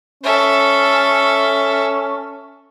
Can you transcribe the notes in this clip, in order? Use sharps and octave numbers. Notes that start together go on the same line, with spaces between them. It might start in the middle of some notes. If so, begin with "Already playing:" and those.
C#4 A4 E5